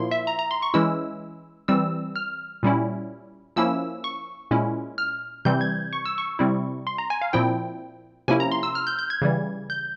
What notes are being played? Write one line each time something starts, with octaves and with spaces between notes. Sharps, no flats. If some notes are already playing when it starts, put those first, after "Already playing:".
Already playing: A#2 F3 A#3 E4 C6
E5
A#5
A#5
C6
C#6
E3 G#3 C#4 E4 E6
E3 G3 C4 E6
F6
A#2 G3 C#4 E4
F3 A#3 C#4 E4 E6
C#6
A#2 G#3 C#4 E4
F6
C3 E3 G3 C4 G6
G#6
C#6
E6
C#6
C3 G3 C4 E4
C6
A#5
G#5
F5
A#2 F3 C4 E4 G5
C3 F3 A#3 C#4 E4 G#5
A#5
C6
E6
F6
G6
G6
G#6
C#3 E3 G3
G6